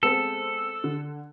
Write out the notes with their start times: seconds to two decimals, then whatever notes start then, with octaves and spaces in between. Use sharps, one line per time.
0.03 G#3 B3 C4 A4
0.84 D3